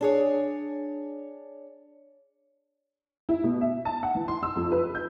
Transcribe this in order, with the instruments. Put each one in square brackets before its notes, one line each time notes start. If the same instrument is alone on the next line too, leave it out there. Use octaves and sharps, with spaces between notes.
[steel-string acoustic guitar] D4 G#4 C#5
[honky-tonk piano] E4
B2
E5
A5
F#5
E3
C6
E6
F2
B4
G6